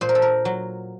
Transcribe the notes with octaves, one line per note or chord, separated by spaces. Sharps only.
A#2 C5
A#4
A4
A#4
F#3